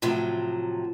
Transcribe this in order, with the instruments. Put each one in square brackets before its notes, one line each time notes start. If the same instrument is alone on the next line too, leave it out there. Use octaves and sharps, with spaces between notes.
[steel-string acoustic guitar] A2 C3 F3 F#3